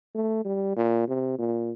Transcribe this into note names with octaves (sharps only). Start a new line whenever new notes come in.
A3
G3
A#2
C3
A#2